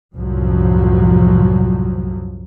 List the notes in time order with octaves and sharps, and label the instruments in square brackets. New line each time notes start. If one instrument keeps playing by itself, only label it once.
[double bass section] C2 F#2 A2 F3 F#3